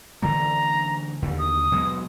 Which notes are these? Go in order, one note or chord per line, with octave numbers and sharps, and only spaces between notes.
D3 E3 A3 A#5
D#2 D3
D#6
B2 F#3 G#3